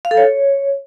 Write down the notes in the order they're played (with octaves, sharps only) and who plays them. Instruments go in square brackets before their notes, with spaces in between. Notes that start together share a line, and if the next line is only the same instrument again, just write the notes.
[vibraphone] F5
A4
C#5